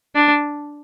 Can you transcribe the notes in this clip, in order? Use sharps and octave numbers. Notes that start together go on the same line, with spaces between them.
D4